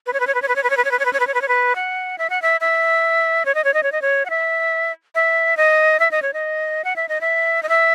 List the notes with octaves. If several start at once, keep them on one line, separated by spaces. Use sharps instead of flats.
B4
C#5
B4
C#5
B4
C#5
B4
C#5
B4
C#5
B4
C#5
B4
C#5
B4
C#5
B4
C#5
B4
C#5
B4
F#5
E5
F#5
E5
E5
C#5
D#5
C#5
D#5
C#5
D#5
C#5
F#5
E5
E5
D#5
E5
D#5
C#5
D#5
F#5
E5
D#5
E5
D#5
E5